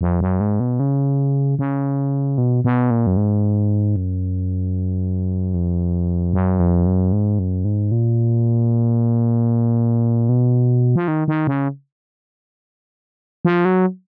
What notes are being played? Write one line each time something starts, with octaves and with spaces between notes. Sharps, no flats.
F2
F#2
G#2
B2
C#3
C#3
B2
B2
A#2
F#2
G#2
F#2
F2
F#2
F2
F#2
G#2
F#2
G#2
A#2
B2
F3
D#3
D#3
C#3
F3
F#3